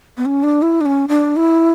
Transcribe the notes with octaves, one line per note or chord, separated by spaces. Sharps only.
B3
C#4
D4
E4
D4
C#4
D4
E4